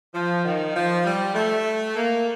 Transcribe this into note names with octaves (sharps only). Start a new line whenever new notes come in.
F3
D#3
F3
G3
A3
A#3